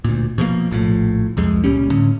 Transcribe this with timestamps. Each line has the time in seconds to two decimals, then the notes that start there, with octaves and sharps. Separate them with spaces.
0.04 D2 A#2
0.38 B2 F3 F#3 A#3
0.71 A#1 A2 F3
1.37 C2 F2 G#3
1.64 C#2 A#2 G3 C#4
1.90 A2 D3 C#4